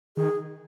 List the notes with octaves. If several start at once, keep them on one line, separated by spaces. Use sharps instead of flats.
D#3 G#4